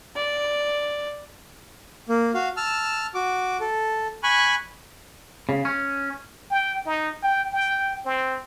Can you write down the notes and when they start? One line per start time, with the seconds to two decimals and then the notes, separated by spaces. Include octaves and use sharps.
0.16 D5
2.09 A#3
2.34 F#4 F5
2.57 A5 E6 F6
3.15 F#4 D6
3.60 A4
4.23 G#5 B5 C#6 F#6
5.49 C#3
5.65 C#4
6.50 G5
6.86 D#4
7.23 G5
7.53 G5
8.05 C4